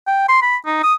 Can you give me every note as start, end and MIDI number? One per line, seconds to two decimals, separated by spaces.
0.07 0.24 79
0.28 0.41 84
0.42 0.57 83
0.66 0.83 63
0.83 0.94 87